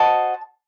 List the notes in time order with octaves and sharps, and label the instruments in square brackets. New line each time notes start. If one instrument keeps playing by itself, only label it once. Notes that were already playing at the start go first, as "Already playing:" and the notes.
Already playing: [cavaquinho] F#4 C5 D#5 A5